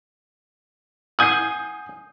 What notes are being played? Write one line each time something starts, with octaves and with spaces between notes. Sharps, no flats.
F#5 G#5 D#6 G6 C7